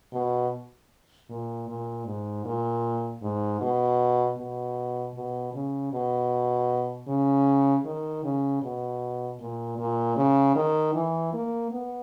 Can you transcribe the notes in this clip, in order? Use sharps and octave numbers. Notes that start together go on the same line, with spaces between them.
B2
A#2
A#2
G#2
A#2
G#2
B2
B2
B2
C#3
B2
C#3
D#3
C#3
B2
A#2
A#2
C#3
D#3
E3
A#3
B3